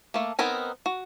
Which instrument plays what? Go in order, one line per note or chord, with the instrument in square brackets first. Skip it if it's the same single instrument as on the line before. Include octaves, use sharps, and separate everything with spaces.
[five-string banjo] A3 A#3
B3 C4 D#4 A#4 G#5
F#4